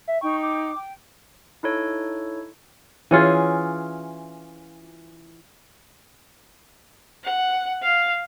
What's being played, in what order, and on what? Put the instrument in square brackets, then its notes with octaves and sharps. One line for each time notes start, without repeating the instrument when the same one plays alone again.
[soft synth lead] E5
[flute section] D#4 G5 [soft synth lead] C#6
[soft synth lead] D6
[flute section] G5
[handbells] D#4 E4 A4 C#5
[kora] E3 C#4 F4 G#4
[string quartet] F#5
F5